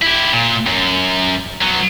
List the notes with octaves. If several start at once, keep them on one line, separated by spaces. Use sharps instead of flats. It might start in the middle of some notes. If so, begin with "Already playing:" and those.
E4 G4
A#2
F#2
F#3 B3